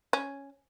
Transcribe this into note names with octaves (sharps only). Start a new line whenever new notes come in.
C#4